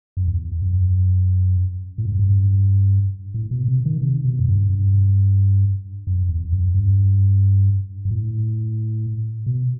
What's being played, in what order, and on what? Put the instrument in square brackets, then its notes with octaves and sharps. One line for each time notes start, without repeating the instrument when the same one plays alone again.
[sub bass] F#2
E2
F#2
A2
G2
F#2
G2
A2
B2
C3
D#3
C3
B2
F#2
G2
G2
F#2
E2
F#2
G2
G2
A2
B2